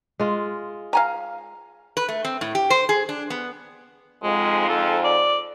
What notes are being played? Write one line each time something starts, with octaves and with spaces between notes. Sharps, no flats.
G#3 F4
F5 G#5 A#5
B4
A3
C4
A2
G4
C5
G#4
D4
B3
F2 G#2 G#3 F4
A4
D5